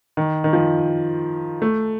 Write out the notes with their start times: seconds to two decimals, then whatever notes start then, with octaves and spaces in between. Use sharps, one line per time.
0.17 D#3
0.44 D#3
0.53 F3
1.62 A3